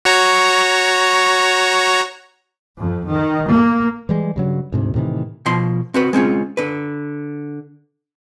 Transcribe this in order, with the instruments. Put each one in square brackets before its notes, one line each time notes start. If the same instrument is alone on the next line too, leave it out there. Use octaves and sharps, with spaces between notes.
[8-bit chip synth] F#4 C#5 A#5
[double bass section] F2
D#3
A#3
[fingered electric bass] E3 G3 G#3
G2 C#3 F#3
D2 G#2 C3
A2 C3 D#3 E3
[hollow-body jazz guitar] B2 F3 C6
C4 F#4 B4
G#3 C4 C#4 F4
D3 B4